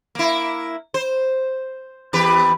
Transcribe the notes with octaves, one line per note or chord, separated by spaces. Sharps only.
A#3 E4
C5
E2 G4 B4